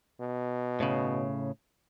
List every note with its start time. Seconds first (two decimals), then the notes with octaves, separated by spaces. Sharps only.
0.20 B2
0.80 A2 C#3